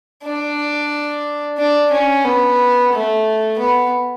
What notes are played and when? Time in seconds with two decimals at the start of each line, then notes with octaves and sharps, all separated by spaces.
0.23 D4
1.58 D4
1.92 C#4
2.25 B3
2.93 A3
3.59 B3